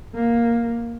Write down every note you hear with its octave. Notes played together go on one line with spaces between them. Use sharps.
A#3